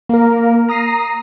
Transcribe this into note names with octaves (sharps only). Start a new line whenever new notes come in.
A#3 A#4
A#5 D#6 A#6 C7